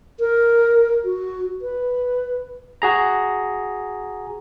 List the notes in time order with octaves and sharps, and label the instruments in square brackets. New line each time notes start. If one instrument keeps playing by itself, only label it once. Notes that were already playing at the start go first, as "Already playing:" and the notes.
[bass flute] A#4
F#4
B4
[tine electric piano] F#4 G#4 A#5